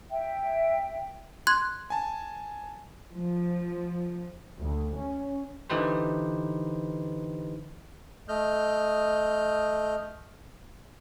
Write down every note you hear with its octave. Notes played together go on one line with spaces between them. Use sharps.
E5 G5
C6 F#6 G#6
G#5 A5
F3
D2
C#4
D3 E3 D#4 G4 B4 C5
A3 D#5 F6 G6